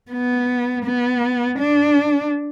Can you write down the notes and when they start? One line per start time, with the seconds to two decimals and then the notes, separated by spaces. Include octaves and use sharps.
0.12 B3
0.85 B3
1.59 D4